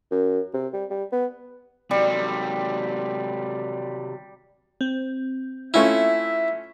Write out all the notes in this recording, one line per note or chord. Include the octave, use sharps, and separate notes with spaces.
F#2
C3
G3
G3
B3
C3 F#3 G3
C4
A3 C#4 E4 F4 E5